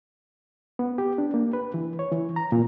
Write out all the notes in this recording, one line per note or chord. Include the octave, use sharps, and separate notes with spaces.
B3
G4
D4
A#3
B4
E3
C#5
E3
A#5
A#2